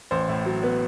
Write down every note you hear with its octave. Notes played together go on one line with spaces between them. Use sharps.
A1 C5
A2
F#3
B3